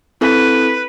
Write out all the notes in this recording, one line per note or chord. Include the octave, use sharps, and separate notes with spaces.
C4 E4 A4 B4